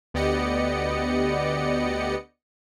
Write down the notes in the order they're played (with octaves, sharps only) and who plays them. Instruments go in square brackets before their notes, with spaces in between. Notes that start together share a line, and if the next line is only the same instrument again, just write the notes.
[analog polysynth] D2 B3 G4 D5 D#5 C#7